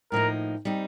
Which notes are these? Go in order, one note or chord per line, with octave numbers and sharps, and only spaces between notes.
A2 F3 A#3 D#4 A#4
G3 C4 D#4